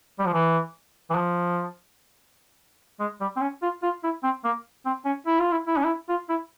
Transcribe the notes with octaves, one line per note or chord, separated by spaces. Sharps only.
G3
F3
E3
E3
F3
G#3
G3
C4
C#4
F4
F4
E4
C4
A#3
C4
C#4
E4
F4
E4
E4
C#4
E4
F4
E4